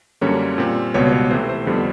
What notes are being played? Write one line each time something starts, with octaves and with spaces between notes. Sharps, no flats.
F#2 D3 G3 A#3 C#4 C#5
A#2 G3 C4
C#2 B2 G3 B3 C#5
C#5
C3 E3 A3 C4 C5
C5
F2 D3 G3 B3